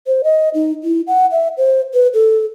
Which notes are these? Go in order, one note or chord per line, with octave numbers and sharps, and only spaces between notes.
C5
D#5
D#4
E4
F#5
E5
C5
B4
A4